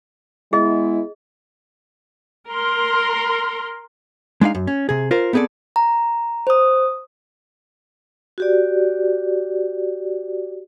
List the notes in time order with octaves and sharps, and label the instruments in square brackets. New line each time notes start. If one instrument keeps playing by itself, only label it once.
[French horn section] G#3 B3 E4 [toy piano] G#4 D#5
[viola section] A#4 C6
[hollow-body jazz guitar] G#3 D4 D#4 F5
F#2
C#4
C3 G#4
F4 A#4 C5
B3 C4 G#4 A4 D5
[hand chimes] A#5
C5 D#6
[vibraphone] F#4 G4 D5